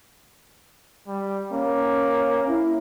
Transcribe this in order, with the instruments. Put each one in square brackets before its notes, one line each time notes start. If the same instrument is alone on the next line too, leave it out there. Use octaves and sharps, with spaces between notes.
[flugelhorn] G3
[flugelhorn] A#3 [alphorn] C#4
[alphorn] E4